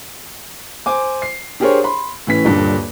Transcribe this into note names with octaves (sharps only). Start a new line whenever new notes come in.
C5 G#5 D6
C7
D4 G4 G#4 A#4 C5 C#5
B5 C6
A2 E3 C#4 B6
D#1 G2 D3